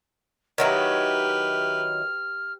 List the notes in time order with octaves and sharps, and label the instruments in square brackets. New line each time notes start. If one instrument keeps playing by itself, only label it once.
[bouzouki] D#3 F#3 E4 [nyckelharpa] G4 B4 [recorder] F6